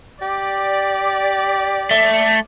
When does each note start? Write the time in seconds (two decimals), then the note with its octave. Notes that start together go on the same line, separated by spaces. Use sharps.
0.22 G4 D5
1.91 A3